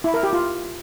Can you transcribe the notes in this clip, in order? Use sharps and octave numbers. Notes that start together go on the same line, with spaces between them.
E4
A#4
G4
F4